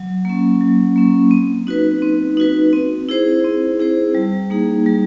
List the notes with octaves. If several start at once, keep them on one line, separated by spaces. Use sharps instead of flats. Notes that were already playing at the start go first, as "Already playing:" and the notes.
Already playing: F#3
A#3 C#4
F#3
A#3 C#4
C4
D#4 F#4 B4
C4
D#4 F#4 B4
C4
E4 G#4 C5
C4
E4 G#4 C5
G3
A#3 D#4 G#4
G3